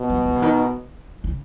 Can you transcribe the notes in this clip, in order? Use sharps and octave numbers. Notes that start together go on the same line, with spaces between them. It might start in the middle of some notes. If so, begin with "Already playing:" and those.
Already playing: B2
F#3
F#3
C#3
D#3
C#3